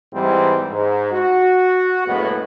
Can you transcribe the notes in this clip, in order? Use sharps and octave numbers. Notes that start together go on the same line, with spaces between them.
G#2 E3 G3 C4
G#2
F#4
F#1 A2 G#3 B3